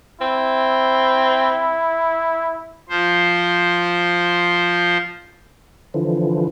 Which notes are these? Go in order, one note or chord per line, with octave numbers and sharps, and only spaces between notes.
C4 E4
F3 C5
D3 E3 F3